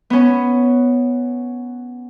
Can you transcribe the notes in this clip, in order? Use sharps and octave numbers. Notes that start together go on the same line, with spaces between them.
B3 C#4